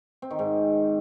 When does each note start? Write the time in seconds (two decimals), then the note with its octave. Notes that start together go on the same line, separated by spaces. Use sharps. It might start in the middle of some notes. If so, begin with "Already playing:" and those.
0.22 C4
0.31 D#3
0.39 G#2